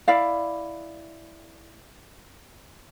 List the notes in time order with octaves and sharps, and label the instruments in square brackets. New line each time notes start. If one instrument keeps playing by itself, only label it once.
[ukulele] E4 D5 F5